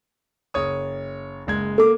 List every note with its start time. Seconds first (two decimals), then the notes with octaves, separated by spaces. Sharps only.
0.54 F#1 C#5 D#6
1.47 F#1 G#3 G#6
1.78 A#3 A4 D6